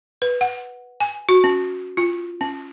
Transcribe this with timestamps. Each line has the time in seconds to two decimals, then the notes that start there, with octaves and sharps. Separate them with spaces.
0.22 B4
0.41 F#5
1.00 G#5
1.29 F#4
1.44 C#4
1.97 F4
2.41 C#4